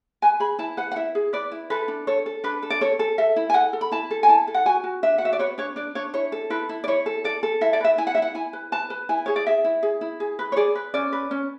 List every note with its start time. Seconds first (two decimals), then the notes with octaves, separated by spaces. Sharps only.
0.22 B4 G#5
0.40 G#4 B5
0.59 E4 A5
0.77 B4 F#5
0.91 F#5
0.96 E4 E5
1.15 G#4
1.33 B4 D5
1.52 E4
1.70 A4 B4
1.88 D4
2.07 A4 C#5
2.26 A4
2.44 D4 B4
2.62 A4
2.70 D5
2.81 A4 C#5
2.99 A4
3.18 A4 E5
3.36 E4
3.50 G#5
3.54 A4 F#5
3.73 A4
3.81 B5
3.91 E4 A5
4.11 A4
4.23 G#5
4.28 E4 A5
4.47 A4
4.54 F#5
4.65 F#4 G#5
4.84 F#4
5.03 D4 E5
5.18 F#5
5.21 F#4 E5
5.33 D5
5.39 B4 C#5
5.58 D4 C#5
5.76 D4 D5
5.95 D4 C#5
6.13 E4 C#5
6.32 A4
6.50 E4 B4
6.69 E4
6.84 D5
6.88 E4 C#5
7.06 A4
7.24 A4 D5
7.43 A4
7.61 E4 E5
7.73 D5
7.80 B4 E5
7.98 E4 G#5
8.07 F#5
8.15 E5
8.17 E4 F#5
8.35 E4 G#5
8.53 B4
8.72 B4 A5
8.90 B4
9.09 E4 G#5
9.26 G#4 C#5
9.36 D5
9.47 G#4 E5
9.64 E4
9.83 G#4
10.01 E4
10.20 G#4
10.39 B4
10.52 C#5
10.56 G#4 D5
10.75 B4
10.94 C#4 D5
11.13 B4
11.31 C#4